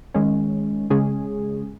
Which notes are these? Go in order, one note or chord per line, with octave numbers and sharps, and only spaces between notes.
D#3 G#3 C#4
C#3 G#3 C#4 G#4